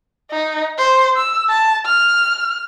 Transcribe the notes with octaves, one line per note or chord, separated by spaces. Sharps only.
D#4
C5
E6
A5
F6